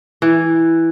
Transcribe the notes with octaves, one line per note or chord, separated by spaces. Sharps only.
E3